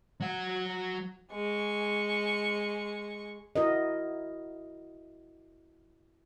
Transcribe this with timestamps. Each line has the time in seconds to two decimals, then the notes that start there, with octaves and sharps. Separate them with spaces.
0.20 F#3 F#5
1.32 G#3 C#6
3.56 E4 F#4 A#4 D#5